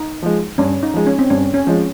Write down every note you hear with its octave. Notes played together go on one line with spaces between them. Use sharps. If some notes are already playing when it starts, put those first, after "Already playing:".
Already playing: D#4
F3 G#3
G2 C#4
D#4
F3 G#3
C#4
C4
G2 C#4
C#4
F3 G#3